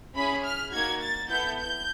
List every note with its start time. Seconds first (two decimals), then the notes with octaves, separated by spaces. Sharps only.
0.14 C#4 E4 G#4 B5
0.44 F6
0.72 A#3 D#4 F#4 G#6
1.01 A6
1.29 B3 E4 A4 G6
1.58 G6